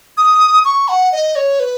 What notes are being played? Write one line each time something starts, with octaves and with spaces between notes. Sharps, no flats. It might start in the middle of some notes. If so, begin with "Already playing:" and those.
D#6
C#6
F#5
D#5
C#5
B4